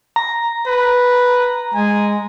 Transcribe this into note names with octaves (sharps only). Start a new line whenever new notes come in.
A#5
B4
G#3 G#5